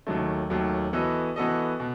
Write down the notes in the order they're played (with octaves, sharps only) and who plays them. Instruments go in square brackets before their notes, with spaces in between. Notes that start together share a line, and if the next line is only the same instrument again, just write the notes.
[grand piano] D#2 D#3 F#3 A3
D#2 D#3 F#3 A3
E3 B3 F#4 A4 D#5
E3 B3 F#4 A4 D#5
B2